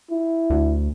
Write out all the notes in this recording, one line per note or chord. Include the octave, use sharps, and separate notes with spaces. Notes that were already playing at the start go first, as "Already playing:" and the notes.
E4
D2